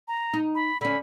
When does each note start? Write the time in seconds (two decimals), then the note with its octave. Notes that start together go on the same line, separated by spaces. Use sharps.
0.08 A#5
0.33 D#4
0.55 B5
0.81 D3 C#4 B5